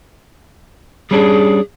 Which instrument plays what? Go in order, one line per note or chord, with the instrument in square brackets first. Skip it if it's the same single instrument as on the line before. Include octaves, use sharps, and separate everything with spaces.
[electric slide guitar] G3 C#4 D4 [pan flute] G#4